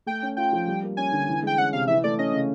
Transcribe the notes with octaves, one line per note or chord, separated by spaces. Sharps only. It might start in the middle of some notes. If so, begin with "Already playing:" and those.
A3 G5
C#4
F4 G5
F3
G3
A#3
C#4 G#5
D3
E3
G#3 G5
C#4 F#5
C3 F5
E3 E5
A3 D5
C#4 D#5
C#3